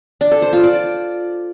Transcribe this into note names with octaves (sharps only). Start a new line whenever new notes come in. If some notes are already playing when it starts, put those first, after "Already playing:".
D4
A4
C5
F4
D5